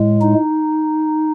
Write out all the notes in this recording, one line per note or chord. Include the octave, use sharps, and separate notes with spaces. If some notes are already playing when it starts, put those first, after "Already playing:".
Already playing: A2 G#3
D#4